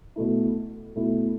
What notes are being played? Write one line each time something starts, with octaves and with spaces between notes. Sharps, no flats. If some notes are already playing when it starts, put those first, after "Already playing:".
B2 A3 E4
B2 A3 E4